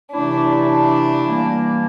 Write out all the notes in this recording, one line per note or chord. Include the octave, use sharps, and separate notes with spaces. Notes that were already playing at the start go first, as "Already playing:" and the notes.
C3 E3 A3 D4 E4
D4
E3 G3 A#3